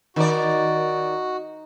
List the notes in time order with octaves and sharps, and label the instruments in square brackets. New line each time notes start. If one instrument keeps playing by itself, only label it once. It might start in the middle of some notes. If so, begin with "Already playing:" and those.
[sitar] D#3 D5 [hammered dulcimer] D#4 [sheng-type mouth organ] F#4